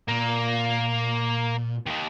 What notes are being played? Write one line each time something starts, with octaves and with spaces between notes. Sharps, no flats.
A#2 A#3
D#2 D#3